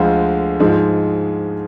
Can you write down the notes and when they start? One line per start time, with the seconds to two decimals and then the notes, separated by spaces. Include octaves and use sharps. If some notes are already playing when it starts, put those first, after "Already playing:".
Already playing: D2 D3 F3 G#3 F5
0.60 G#2 F3 G#3